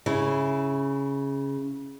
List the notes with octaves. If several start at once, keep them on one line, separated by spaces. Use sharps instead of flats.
C#3 E4